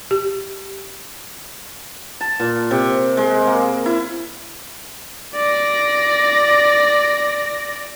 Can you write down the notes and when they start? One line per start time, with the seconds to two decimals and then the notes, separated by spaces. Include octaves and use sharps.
0.11 G4
2.21 A5
2.40 A#2
2.71 C3
3.17 G#3
3.47 A#3
3.86 E4
5.35 D5 A#6